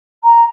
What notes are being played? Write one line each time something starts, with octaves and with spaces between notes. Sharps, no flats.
A#5